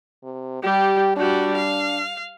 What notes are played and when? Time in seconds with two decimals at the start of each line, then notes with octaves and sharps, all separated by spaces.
0.23 C3
0.63 G3 G4
1.17 G3 D4 F#4
1.57 F5